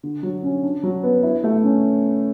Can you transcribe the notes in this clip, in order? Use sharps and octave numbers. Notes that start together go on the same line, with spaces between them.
D3
F#3
C#4
D4
F#3
B3
E4
A3
C#4